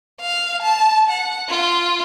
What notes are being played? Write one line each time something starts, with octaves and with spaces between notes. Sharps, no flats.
F5
A5
F#5
F4